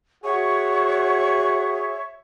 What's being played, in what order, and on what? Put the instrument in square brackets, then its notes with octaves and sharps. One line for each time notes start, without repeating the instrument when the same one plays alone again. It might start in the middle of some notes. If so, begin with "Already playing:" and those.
[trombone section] F#4 [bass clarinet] G#4 [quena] C#5 [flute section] E5 C#6